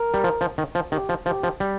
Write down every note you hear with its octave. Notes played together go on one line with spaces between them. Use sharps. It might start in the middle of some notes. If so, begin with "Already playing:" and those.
Already playing: A#4
G3
F3
F3
D#3
F3
D#3 G4
F3
F3 G4
F3
G3